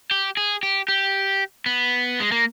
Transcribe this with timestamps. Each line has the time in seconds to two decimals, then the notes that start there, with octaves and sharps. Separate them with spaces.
0.11 G4
0.37 G#4
0.63 G4
0.88 G4
1.66 B3
2.20 G#3
2.32 A#3